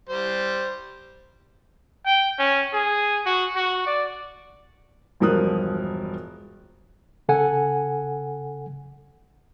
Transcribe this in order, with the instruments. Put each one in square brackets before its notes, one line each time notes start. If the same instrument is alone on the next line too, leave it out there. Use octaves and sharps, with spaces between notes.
[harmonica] G3 C5
[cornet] G5
C#4
G#4
F#4
F#4
D5
[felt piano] E1 G2 F3 A#4 D#6 F#6
[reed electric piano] C#3 A4 F#5 G#5